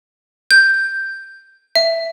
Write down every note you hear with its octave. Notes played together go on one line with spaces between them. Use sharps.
G6
E5